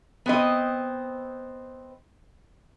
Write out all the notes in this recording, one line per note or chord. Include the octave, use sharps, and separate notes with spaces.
B3 C4 D#5